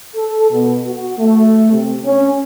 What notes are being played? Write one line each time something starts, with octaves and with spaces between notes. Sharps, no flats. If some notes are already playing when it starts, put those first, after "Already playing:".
A4
B2
F#4
A3
C3
C#4